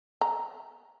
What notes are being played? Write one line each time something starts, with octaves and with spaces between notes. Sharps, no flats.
A#5